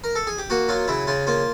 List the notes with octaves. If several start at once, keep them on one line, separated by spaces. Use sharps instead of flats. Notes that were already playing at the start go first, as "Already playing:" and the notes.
A#4
A4
G#4
G4
A#3 F#4
F#3 F4
C#3 E4
C#3 F4
A#3 F4